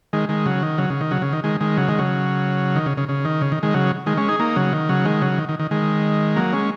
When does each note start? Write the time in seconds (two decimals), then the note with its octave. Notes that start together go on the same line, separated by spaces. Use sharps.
0.13 D#3 G#3
0.29 D#3 G#3
0.46 C#3 F#3
0.62 D#3
0.78 C#3 F#3
0.90 C#3
1.01 D#3
1.11 C#3 F#3
1.22 C#3
1.33 D#3
1.44 D#3 G#3
1.60 D#3 G#3
1.77 C#3 F#3
1.88 D#3 G#3
1.99 C#3 F#3
2.76 D#3
2.86 C#3
2.97 C#3
3.09 C#3
3.25 D#3
3.41 C#3
3.52 D#3
3.63 D#3 G#3
3.74 C#3 F#3
4.06 D#3 G#3
4.17 G#3 C#4
4.29 D#4 G#4
4.40 A#3 D#4
4.56 C#3 F#3
4.72 D#3
4.89 C#3 F#3
5.05 D#3 G#3
5.21 C#3 F#3
5.38 D#3
5.49 D#3
5.59 D#3
5.71 D#3 G#3
6.36 F#3 A#3
6.53 G#3 C#4